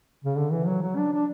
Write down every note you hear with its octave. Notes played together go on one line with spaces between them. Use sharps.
C#3
D3
E3
F#3
F#3
D4
D4